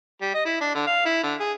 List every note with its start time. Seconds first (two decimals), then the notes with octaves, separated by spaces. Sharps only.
0.21 G3
0.34 D#5
0.45 E4
0.61 D4
0.75 D3
0.87 F5
1.06 E4
1.23 D3
1.39 G#4